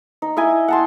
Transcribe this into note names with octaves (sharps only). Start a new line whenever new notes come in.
D#4
E4 D#5 G#5
F#5 A5 C6